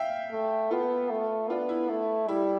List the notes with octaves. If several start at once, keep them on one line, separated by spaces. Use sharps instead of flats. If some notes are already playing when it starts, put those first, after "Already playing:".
Already playing: E5 F5 G5
A3
B3 F4 A4
A3
B3 D4 F4
E4
A3
G3 E4